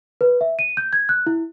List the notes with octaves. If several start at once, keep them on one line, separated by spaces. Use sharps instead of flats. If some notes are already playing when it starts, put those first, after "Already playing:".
B4
E5
D#7
G6
G#6
F#6
E4